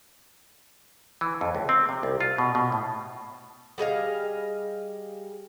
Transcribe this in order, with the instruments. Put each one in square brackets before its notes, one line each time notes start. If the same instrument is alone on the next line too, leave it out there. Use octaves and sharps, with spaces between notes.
[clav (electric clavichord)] E3
F2
C#2
C4
C3
C2
F4
B2
B2
A2
[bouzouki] G3 G#4 D#5 F5